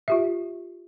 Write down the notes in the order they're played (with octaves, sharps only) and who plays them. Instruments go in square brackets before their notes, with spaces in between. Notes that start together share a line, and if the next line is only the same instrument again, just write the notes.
[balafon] F4 G4 E5